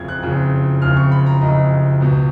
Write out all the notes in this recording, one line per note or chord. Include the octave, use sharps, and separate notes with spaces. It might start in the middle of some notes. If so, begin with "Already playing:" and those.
Already playing: F#1 F2 C#3 G#6
F#6
F#1 F2 C#3
F#1 F2 C#3 F6
C#6
B5
A#5
F#1 F2 C#3 D#5
C#2 B2